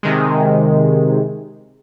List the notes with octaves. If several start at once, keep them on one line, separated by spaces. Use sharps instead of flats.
C3 D#3 G#3